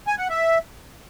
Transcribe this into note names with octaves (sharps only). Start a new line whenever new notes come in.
G#5
F#5
E5